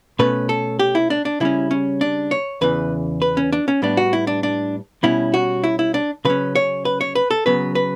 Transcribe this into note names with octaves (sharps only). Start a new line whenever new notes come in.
B2 A3 C#4 B4
A4
G4
E4
D4
D4
C#3 G3 C#4 E4
C#4
D4
C#5
E2 C#3 E3 B4
B4
C#4
D4
C#4
A2 G3 B3 D4
F#4
E4
D4
D4
B2 G3 C#4 E4
F#4
E4
E4
D4
C#3 F#3 C#4 B4
C#5
B4
C#5
B4
A4
C#3 F#3 B3 B4
B4